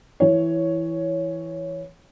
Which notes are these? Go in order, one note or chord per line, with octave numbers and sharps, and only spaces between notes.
E3 C#5